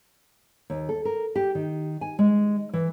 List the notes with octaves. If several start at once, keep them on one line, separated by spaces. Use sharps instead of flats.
D#2
A4
A#4
G4
D#3
G#5
G#3
E3